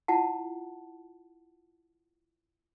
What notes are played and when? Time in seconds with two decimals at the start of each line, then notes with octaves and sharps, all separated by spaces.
0.08 E4 F4 F#5 A5